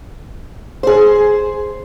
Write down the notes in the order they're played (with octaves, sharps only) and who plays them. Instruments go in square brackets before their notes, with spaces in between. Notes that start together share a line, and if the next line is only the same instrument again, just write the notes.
[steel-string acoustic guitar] G#4 C5